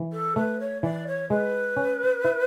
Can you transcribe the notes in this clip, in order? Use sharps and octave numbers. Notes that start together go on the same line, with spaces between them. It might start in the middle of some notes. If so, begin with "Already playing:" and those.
Already playing: E3
A4
A3 B4
C#5
E3 D5
C#5
G#3 B4
C#4
E4